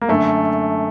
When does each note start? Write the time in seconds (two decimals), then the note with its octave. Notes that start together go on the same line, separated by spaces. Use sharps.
0.01 A#3
0.08 F#2 D3 A3